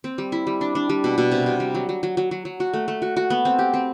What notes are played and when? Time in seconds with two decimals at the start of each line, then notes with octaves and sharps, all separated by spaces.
0.04 C4
0.18 G3
0.32 E4
0.47 G3
0.61 D4
0.75 D4
0.89 G3
1.04 B2
1.18 B2
1.31 C3
1.46 C3
1.60 G3
1.75 F#3
1.89 F#3
2.03 F#3
2.17 F#3
2.31 F#3
2.45 F#3
2.60 F#4
2.74 A3
2.88 A3
3.02 F#4
3.17 F#4
3.30 B3
3.45 C4
3.59 G4
3.74 C4